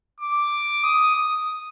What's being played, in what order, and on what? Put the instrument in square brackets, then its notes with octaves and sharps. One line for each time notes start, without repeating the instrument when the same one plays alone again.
[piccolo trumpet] D6
D#6
D#6